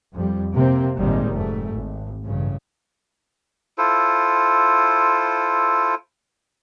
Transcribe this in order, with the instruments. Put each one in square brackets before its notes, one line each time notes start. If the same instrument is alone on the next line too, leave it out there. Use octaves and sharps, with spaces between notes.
[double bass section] F2 G3
C3 A#3 C4
G#1 D#2 A#2 D#3 G3 G#3
F1 G#2 A3
G#1
A1 G2 C#3
[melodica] E4 F4 A4 C5